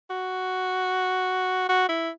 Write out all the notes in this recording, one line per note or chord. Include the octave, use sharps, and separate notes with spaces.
F#4
F#4
E4